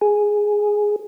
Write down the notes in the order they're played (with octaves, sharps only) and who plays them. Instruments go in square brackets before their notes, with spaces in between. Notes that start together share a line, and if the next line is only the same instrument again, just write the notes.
[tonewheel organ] G#4